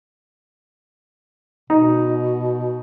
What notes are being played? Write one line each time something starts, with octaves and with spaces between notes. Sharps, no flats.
B2 D#4